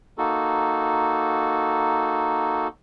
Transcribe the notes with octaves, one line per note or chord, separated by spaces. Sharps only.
A#3 D#4 F#4 A4